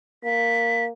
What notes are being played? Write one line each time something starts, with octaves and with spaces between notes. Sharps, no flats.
A#3 B6